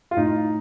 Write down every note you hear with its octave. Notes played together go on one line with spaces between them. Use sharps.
F4
A2 D#4